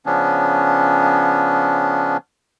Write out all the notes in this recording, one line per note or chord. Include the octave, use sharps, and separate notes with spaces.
C#3 F3 B3 C#4 D4